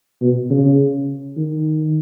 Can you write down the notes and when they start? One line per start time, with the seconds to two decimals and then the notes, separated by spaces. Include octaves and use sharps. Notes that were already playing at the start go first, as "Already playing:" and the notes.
0.22 B2
0.50 C#3
1.37 D#3